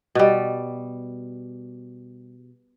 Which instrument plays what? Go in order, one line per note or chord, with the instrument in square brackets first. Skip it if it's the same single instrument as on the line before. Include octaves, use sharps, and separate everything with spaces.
[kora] B2 G3